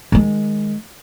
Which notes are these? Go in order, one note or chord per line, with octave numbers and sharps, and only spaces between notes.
D#3 G#3